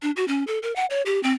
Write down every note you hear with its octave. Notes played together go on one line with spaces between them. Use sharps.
D4
F#4
C#4
A4
A#4
F#5
C#5
G4
C4